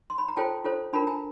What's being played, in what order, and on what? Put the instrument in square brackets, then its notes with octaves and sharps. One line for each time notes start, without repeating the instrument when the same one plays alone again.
[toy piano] C6
B5
A#5
F4 A4 C5 G5 A5
F4 A4 C5
D4 F4 A#4 A5 B5
G#5 A#5